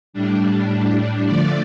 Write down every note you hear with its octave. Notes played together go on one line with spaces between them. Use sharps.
A2 G3 D4
D3 F3 A3 D5